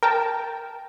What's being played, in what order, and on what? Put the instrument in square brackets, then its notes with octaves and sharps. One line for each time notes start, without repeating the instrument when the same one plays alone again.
[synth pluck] A#4 G5 A5